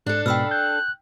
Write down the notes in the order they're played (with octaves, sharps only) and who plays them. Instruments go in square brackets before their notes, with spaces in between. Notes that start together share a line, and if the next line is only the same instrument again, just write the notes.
[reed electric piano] G#2 [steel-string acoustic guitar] D4 A4 [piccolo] F#6
[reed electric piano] G#2 B2 [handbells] G5 E6 F6 [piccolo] B5
[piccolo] F#6 [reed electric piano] G6